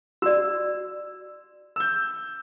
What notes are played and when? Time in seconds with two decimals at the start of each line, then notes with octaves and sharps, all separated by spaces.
0.22 F#4 D5 E6
1.76 E6 G6